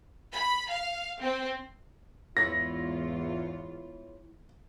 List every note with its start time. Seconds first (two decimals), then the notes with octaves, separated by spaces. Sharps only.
0.32 B5
0.69 F5
1.19 C4
2.37 E2 G#2 E4 F4 C#5 A#6